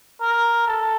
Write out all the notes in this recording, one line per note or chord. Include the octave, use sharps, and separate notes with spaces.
A#4
A4